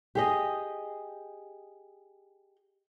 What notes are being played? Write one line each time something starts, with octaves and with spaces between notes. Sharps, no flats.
G4 G#4 D#5